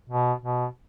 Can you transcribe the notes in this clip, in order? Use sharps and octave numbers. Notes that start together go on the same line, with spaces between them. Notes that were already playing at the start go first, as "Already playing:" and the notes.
B2
B2